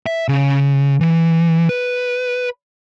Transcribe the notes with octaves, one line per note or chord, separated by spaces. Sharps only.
E5
C#3
E3
B4